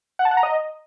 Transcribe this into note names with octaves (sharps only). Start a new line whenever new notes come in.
F#5
A5
F#5
A#5
D#5